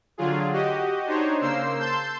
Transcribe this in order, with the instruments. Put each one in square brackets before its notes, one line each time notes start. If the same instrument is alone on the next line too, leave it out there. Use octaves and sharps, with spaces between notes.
[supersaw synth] D3 F#3 F4 G#4
F#4 G4 D#5
D4 D#4 C5 C#5
C#3 A#3 C5 E6 C7
A5 C6 E6 G6 E7